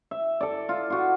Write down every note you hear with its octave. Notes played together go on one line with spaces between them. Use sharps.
E5
A4 D5
F4
F4 F#4